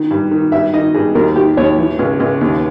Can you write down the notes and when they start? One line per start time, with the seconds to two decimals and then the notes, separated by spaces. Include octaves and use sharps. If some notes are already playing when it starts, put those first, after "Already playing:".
Already playing: D#3
0.11 G2
0.31 D#3
0.52 G2 E5
0.73 D#3 D#5
0.94 G2 G#4
1.15 D#2 A#4
1.36 D#3 G4
1.57 D#2 C#5
1.78 E3
1.99 C#2
2.20 C#2
2.41 D#2